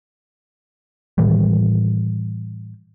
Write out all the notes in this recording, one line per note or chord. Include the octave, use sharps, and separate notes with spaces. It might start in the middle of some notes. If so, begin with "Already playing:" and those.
A2 D#3 E3 G3